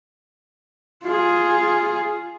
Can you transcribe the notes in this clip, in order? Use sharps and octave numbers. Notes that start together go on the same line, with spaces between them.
F4 G#4